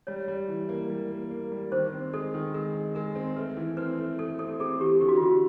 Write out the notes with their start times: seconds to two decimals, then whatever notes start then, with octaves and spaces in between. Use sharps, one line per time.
0.07 G3 C#5
0.28 G3
0.48 E3
0.69 A#3
0.90 G3
1.11 A#3
1.31 A#3
1.52 G3
1.72 D#3 C5
1.92 C4
2.13 G#3 A4
2.34 D#3
2.54 G#3 A#4
2.74 G#3
2.95 G#3 A#4
3.15 C4
3.36 A3 B4
3.57 E3
3.77 C4 B4
3.98 A3
4.18 A3 A4
4.39 C4 A4
4.60 C4 G#4
4.80 E3 G4
5.01 D3 G4
5.08 F#4
5.17 F4
5.21 D3 F#4